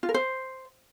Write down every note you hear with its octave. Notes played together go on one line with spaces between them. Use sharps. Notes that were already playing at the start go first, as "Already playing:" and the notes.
F4
A#4
C5